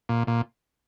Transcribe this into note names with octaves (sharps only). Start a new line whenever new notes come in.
A#2
A#2